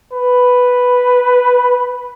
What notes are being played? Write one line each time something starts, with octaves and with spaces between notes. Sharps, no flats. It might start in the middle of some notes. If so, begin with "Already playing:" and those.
B4